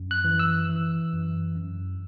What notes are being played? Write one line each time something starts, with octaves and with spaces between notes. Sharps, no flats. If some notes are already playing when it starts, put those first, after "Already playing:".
Already playing: F#2
F#6
E3
E6
E3
F#2
F#2